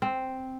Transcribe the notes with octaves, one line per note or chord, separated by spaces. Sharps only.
C4